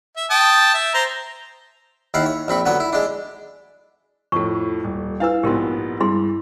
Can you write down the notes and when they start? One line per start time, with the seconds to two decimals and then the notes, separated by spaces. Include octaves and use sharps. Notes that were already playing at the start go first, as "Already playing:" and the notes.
0.17 E5
0.31 G5 A5 D#6
0.74 E5
0.94 C5 A#5
2.14 D#2 E4 F5 F#5
2.26 C#5
2.48 A#1 C4 B5 C#6
2.66 D3 F#3 B3 C#5
2.80 E4
2.93 G#3 D4
4.32 F2 A2 A4 C#6
4.84 D#1
5.20 D4 E4 B4 F5 E6
5.43 A#1 G#2 B3 G4 A#4 C6
6.00 G2 E4 G#4 C6